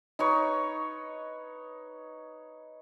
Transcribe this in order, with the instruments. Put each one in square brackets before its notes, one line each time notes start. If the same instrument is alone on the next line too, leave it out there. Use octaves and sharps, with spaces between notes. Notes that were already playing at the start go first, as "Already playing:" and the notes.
[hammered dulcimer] D#4 B4 C#5